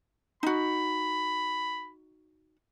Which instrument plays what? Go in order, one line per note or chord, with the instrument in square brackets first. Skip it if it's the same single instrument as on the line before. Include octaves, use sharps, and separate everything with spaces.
[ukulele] D#4 F#4 [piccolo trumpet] B5